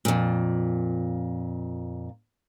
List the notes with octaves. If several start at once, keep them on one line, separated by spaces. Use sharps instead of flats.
F2 A#2